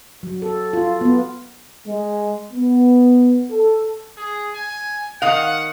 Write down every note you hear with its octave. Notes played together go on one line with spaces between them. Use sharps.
F#3
A4
F4
B3
G#3
B3
A4
G#4
G#5
D#3 F5 F#5